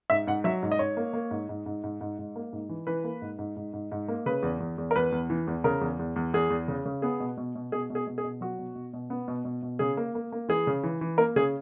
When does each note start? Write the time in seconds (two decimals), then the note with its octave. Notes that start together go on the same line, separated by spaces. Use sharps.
0.10 G#2 E5
0.27 G#2 F#5
0.44 F#3 E5
0.63 G#2
0.72 D#5
0.79 G#2 C#5
0.97 A#3
1.14 A#3
1.31 G#2
1.49 G#2
1.66 G#2
1.84 G#2
2.01 G#2
2.19 G#2
2.36 A#3
2.53 G#2
2.69 E3
2.87 E3 B4
3.04 A#3
3.22 G#2
3.39 G#2
3.56 G#2
3.73 G#2
3.92 G#2
4.08 A#3
4.26 C#3 B4
4.43 E2
4.60 E2
4.78 E2
4.91 A#4
4.96 E2 B4
5.12 E2
5.30 E3
5.47 E2
5.64 C#3 A#4
5.81 E2
5.99 E2
6.16 E2
6.34 E2 G#4
6.50 E2
6.68 C#3
6.86 C#3
7.02 B3 G#4
7.20 B2
7.37 B2
7.55 B2
7.72 B2 G#4
7.90 B2
7.95 G#4
8.07 B2
8.18 G#4
8.24 B2
8.41 F#3 F#4
8.59 B2
8.75 B2
8.93 B2
9.10 B3
9.28 B2
9.45 B2
9.63 B2
9.79 C#3 G#4
9.97 A#3
10.15 A#3
10.32 A#3
10.49 E3 G#4
10.67 C#3
10.84 E3
11.01 E3
11.18 A#3 A#4
11.36 C#3 G#4